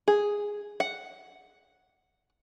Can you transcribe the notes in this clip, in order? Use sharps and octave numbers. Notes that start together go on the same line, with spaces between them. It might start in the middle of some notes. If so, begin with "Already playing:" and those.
G#4
F#5